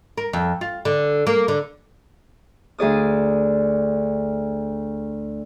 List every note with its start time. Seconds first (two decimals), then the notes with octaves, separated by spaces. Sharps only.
0.18 A#4
0.33 F2
0.61 F4
0.85 D3
1.27 A#3
1.48 D3
2.79 D2 G#4 D5 D#6